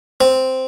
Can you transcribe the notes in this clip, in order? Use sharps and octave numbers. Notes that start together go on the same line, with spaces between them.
C4